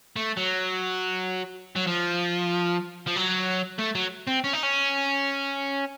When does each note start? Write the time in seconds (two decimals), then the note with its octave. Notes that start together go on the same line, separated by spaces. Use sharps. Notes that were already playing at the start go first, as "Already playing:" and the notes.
0.16 A3
0.37 F#3
1.76 F#3
1.87 F3
3.06 F3
3.16 F#3
3.79 A3
3.95 F#3
4.27 C4
4.44 C#4
4.53 D#4
4.63 C#4